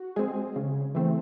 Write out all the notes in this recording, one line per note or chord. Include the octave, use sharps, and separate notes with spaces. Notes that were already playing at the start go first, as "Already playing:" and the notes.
Already playing: F#4
G#3 C4 G#4
C#3
E3 A3 C4